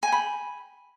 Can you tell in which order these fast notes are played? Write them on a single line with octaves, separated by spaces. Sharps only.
G#5 G5 B5